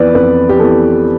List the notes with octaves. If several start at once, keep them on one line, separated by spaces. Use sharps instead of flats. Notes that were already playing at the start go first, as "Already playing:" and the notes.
Already playing: F2 E3 B3 B4 D5
F2 B4
G4
E3 B3 A4